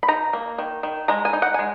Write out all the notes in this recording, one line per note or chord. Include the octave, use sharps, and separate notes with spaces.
B5
D#4 A#5
A#3
D#3
D#3
G#3 A#5
G#5
D#4
F#5
G#3 G#5